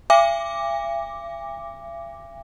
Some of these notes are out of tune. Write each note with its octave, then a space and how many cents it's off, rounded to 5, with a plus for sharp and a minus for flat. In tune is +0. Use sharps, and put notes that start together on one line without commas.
E5 +45 G#5 -45 D6 +0